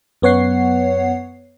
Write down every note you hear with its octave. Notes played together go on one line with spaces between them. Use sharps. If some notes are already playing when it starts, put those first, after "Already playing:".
F#2 B3 C#5 F#5 C7